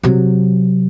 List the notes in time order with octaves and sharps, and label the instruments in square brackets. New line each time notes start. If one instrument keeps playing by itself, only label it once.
[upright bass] C3 F#3